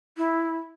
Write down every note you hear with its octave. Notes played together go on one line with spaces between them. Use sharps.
E4